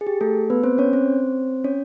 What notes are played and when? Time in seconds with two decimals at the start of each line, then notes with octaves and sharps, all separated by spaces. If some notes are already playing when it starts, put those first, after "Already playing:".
0.01 G#4
0.07 G4
0.21 A3 A4
0.50 B3 B4
0.64 C4 C5
0.78 C#4 C#5
0.93 C4 C5
1.64 C#4 C#5